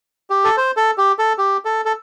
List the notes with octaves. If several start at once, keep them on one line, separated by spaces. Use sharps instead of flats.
G4
A4
C5
A4
G4
A4
G4
A4
A4